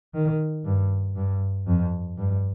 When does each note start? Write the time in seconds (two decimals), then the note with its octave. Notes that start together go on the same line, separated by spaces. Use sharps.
0.14 D#3
0.66 G2
1.16 G2
1.67 F2
2.18 G2